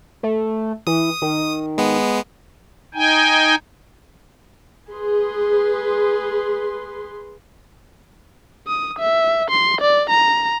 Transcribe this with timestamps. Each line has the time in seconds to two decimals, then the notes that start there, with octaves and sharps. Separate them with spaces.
0.23 A3
0.87 E3 D#6
1.22 D#3
1.78 G#3 B3
2.95 D#4 G5 G#5
4.89 G#4 B4 C6
8.67 D#6
8.99 E5
9.50 C6
9.81 D5
10.10 A#5